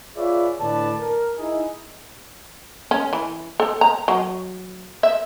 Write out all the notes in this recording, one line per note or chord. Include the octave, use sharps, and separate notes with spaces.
F4 G#4 B4 C#5 D5 E5
A2 D3 B4 D5 A5
A#4
D#4 E4 G#4
C#4
E3
A4
A#5
F#3
E5